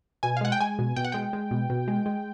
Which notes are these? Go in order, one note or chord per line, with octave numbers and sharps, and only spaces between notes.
B2 G#5
F5
G#3 F#5
G5
G#3 G#5
B2
B2 G5
F#5
G#3 G5
G#3
B2
B2
G#3
G#3